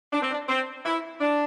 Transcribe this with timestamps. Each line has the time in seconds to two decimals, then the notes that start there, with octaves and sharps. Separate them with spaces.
0.12 D4
0.22 C4
0.31 D4
0.48 C4
0.85 E4
1.21 D4